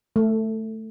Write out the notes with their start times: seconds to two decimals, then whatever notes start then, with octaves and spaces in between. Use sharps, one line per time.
0.16 A3